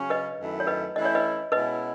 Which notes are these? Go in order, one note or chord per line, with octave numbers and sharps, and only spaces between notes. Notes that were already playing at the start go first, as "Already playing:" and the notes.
Already playing: C#3 F#3 C#4
B4 D#5
F#2 D#3 A3 E4
C#5
B4 D#5
E3 A3 C#4 E4 D#5
C#5
B4 D#5
B2 G#3 C#4 E4 B4 D#5